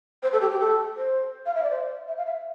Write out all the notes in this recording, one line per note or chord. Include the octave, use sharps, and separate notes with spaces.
C5
A4
G4
G4
A4
C5
F5
E5
D5
C5
E5
F5
E5